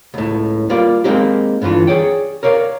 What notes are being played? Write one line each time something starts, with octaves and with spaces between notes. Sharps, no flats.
C#2 A2
G3 A#3 F4 D5
G#3 A#3 C4 D#4 G4
G2 D3 E3 F4
G#4 C#5 D5 G5
A#4 C#5 D5 F5